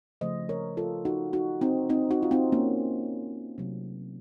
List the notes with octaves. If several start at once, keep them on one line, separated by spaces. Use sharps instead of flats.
C#3 F3 A3 C5 D#5
A#4 C#5
F4 A4
D#4 F#4
D#4 F#4
C4 D#4
C4 D#4
D#4 F#4
F4
C4 D#4
A#3 C#4
C3 F#3 A3